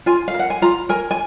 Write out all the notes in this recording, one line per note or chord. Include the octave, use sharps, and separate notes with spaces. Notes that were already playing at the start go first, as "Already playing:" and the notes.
F4 G#5
F5
A#4
F#5
G#5
F4 A#5
A#4 G#5
G#5